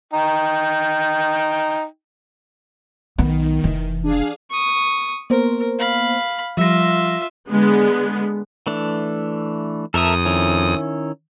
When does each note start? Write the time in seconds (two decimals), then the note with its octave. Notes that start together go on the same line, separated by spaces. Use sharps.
0.13 D#4 G5
3.18 B1 D#3 B3
3.64 F1 E3
4.03 D4 G#4 F5
4.50 C#6 D#6
5.30 A#3 B3 A#4 C5
5.79 F5 B5
6.57 F3 G3 F4 E5 A#6
7.49 D3 G#3 B3
8.67 E3 A3 D4
9.94 F2 A4 A#4 E5 D#6
10.25 D#3 C#4 E4